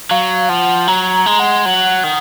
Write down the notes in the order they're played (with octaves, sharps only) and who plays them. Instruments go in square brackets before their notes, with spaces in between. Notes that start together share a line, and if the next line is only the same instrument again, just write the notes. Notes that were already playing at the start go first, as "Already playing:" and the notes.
[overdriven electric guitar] F#3 [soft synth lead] F5
[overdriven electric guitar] F3 [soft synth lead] F#5
[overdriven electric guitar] F#3 [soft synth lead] A#5
[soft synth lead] A#5
[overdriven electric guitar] G#3
[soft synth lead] F#5
[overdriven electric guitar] F#3
D#3